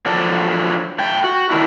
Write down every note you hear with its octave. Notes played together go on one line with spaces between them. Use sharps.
F3 F#3 D4 A4
A3 G5
F#4
A2 D#3 C4 D4 E4